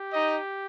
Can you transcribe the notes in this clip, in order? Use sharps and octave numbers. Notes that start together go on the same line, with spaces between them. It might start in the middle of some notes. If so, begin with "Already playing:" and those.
Already playing: G4
D#4 D#5